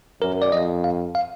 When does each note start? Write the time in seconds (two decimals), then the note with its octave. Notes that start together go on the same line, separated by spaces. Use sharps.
0.22 F#2 A#4
0.42 D5
0.52 F2 D#5
0.84 F5
1.15 F5